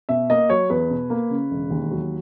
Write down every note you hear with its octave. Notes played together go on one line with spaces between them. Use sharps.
B2 E5
A#3 D#5
F#3 C#5
E2 B4
B2
A#3
C#3
E1
D#2
F#3